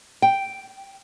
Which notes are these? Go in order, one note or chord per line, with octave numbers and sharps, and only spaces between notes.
G5